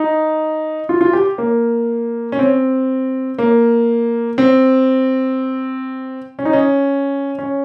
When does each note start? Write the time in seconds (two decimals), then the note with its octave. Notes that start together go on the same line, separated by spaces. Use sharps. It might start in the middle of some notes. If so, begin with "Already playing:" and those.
Already playing: D#4
0.89 F4
1.01 F4
1.13 G4
1.38 A#3
2.32 C#4
2.39 C4
3.39 A#3
4.38 C4
6.39 C#4
6.45 D#4
6.53 C#4
7.39 C#4